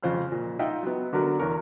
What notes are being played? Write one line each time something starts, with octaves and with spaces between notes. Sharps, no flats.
F2 C#3 F4 C5 F6 F#6
A#2
D#4 F4 D#5 E5 F#5 G5
F#3 B3
D3 F#3 B3 F#4 A#4 B4
E2 C#4 A#4 C#6